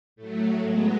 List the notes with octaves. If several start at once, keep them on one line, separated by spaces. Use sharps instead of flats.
A2 F#3 A3
G#3 B3